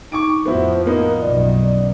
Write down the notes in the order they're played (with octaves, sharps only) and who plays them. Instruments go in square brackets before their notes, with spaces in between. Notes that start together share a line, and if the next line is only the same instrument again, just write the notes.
[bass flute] D#4 [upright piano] C#6 D6 D7
[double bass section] F2 A2 F3 [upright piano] B3 E4 F#4 [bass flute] C5
[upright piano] A#3 B3 D#4 [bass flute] A#4
[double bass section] B1 F#2 D#3 [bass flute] D5
[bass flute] D5